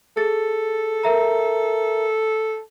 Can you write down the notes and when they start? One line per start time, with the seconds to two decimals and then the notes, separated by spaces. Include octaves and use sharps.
0.17 G#4 A4 A6
1.04 A#4 E5 A#5